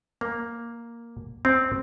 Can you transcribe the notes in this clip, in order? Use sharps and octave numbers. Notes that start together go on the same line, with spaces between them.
A#3
C4